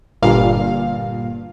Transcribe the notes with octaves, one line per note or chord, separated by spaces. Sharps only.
G1 G2 A#2 F5